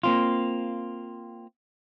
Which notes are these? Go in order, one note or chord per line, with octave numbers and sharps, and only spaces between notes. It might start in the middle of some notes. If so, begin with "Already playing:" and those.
A#3 C4 F4